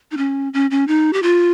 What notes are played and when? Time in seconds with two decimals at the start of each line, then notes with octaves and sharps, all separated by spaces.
0.11 D#4
0.17 C#4
0.54 C#4
0.71 C#4
0.88 D#4
1.13 G4
1.23 F4